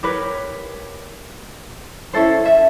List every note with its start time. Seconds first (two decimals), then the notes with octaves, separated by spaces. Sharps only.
0.03 G4 A#4 B4 C#5
2.13 C#4 E4 A4 C5
2.45 E5